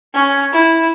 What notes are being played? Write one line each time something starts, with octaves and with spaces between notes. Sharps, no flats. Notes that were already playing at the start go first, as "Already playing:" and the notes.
C#4
E4